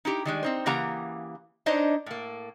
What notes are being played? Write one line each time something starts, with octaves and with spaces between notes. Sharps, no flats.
D#4 E4 G4
D#3 G3 G#3
C4 D#4 C5
C#3 E3 A#3 G4 F#5 A#5
D4 D#4 C5 C#5 D#5
A2 A#3